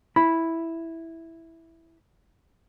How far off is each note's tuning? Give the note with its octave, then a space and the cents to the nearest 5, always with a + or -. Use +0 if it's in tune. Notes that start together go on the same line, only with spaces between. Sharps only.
E4 -5 B5 +0